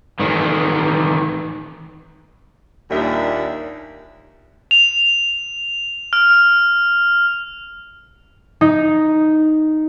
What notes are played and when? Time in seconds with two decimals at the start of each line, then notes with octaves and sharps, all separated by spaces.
0.20 A2 D#3 E3
2.91 D#2 A#2 G3 D4 D#4 E5
4.71 F7
6.13 F6
8.61 D#4